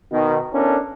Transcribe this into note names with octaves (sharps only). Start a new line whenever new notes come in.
B2 D#3
B3 C#4 D4 E4 A4 A#4